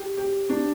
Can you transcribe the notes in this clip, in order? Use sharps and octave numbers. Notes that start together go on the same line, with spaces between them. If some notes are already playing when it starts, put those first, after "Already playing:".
Already playing: G4
G4
D4